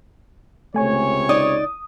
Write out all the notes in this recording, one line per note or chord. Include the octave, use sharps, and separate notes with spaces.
C#2 C3 A3 C#5 G#5 C#6
D#4 D5 D#6